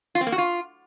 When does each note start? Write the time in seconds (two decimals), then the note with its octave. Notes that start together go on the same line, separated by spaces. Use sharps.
0.15 F4
0.21 C4
0.27 A#3
0.32 F#4
0.38 F4